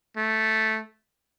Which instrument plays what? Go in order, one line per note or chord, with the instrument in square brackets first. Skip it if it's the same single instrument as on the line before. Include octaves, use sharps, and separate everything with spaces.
[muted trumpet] A3